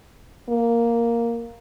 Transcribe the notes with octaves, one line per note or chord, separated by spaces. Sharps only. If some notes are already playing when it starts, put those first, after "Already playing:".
A#3